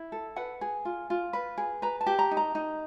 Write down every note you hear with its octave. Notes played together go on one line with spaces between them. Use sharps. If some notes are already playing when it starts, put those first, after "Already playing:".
Already playing: E4
A4
B4 F#5
G#4
F4
F4
B4
G#4
B4 A#5
A5
G4
A#5
D#4
A#5
D#4